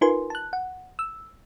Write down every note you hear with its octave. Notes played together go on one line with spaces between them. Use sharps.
D#4 F4 A#4 B4 G#5 C6
A5 F#6
F#5
E6